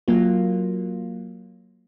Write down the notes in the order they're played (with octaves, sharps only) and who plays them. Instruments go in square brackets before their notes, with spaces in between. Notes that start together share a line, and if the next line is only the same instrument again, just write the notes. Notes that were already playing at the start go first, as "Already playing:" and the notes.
[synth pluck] F#3 A#3 F4